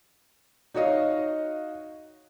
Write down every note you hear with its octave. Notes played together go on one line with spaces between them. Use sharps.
D#4 F#4 C#5 D#5 F5